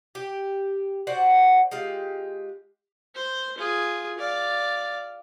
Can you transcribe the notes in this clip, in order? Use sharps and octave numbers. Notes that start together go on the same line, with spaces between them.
G4
F#4 C5 D5 F#5
G#3 F4 G4
C5
F4 G#4
D5 F5